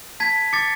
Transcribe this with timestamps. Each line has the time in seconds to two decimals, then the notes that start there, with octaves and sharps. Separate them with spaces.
0.20 A5 G#6 B6
0.53 D6 A6 C#7